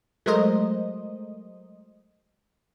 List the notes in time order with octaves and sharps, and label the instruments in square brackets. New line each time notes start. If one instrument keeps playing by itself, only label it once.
[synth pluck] F#3 G#3 A3 A#4 C5 D#5